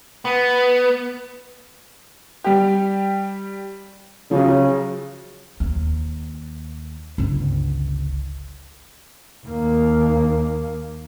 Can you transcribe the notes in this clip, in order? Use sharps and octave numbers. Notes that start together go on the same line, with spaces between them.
B3
G3 G4
C#3 F3 F#3
D#2
G1 C#2
D#2 A#3